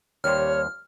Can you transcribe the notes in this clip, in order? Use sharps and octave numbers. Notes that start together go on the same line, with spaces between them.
D#2 G3 C5 C#5 F6